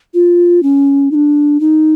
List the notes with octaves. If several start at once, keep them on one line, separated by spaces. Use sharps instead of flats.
F4
C#4
D#4
D4
D#4